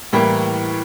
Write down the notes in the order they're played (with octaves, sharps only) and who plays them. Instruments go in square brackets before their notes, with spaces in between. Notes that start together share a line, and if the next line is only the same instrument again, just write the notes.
[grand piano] A2 E3 G3 A#3